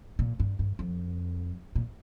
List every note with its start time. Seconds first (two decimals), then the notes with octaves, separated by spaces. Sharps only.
0.19 A#2
0.40 G2
0.59 G2
0.79 F2
1.75 A#2